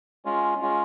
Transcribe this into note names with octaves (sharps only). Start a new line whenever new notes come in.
G#3 C#4 F4
G#3 C#4 F4